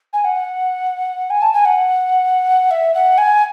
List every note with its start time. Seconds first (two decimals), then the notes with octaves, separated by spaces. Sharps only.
0.13 G#5
0.25 F#5
1.30 G#5
1.42 A5
1.54 G#5
1.65 F#5
2.71 E5
2.94 F#5
3.18 G#5